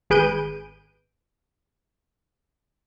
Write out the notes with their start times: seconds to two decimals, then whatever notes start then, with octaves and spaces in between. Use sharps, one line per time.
0.10 G#1 G#4 B4 G6 D7 D#7